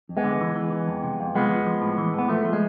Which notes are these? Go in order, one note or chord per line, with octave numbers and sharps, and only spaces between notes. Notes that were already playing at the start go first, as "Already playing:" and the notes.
F2
G#3 B3
D3
E3
E3
E3
F2
C3
F2
F3 G#3 B3
F3
F3
A2
E3
A2 B3
F3 A3
F3
G#3